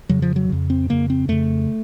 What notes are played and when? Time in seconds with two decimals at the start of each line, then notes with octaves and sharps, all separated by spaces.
0.09 F2 C#3 F#3
0.22 F3
0.36 F#3
0.49 F2 C#3
0.70 C4
0.89 F2 C#3 A#3
1.10 C4
1.28 F2 C#3 A3